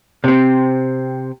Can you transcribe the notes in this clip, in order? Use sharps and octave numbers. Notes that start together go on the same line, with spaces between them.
C3 C4